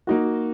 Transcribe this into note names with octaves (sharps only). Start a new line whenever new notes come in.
A#3 D#4 F#4